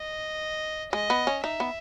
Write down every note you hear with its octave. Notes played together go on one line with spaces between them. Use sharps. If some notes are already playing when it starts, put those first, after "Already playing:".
Already playing: D#5
G#3 D#5
B3
C#4
D#4 E5
B3